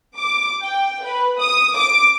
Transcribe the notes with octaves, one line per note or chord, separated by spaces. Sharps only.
D6
G5
B4
D#6
D6